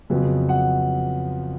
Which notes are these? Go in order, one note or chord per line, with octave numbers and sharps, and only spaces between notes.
F2 C#3 F#3 B3
F#5